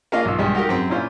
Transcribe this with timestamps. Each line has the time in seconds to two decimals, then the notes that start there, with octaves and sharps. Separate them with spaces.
0.12 A#3 C#4 D4 F4 D#5 F5
0.25 B1 F4 E6
0.38 B1 G2 G3 G#3
0.55 D#4 F#4 G4 A#4
0.69 F#2 C4 C6
0.90 A#2 C#4 E4 F4 C5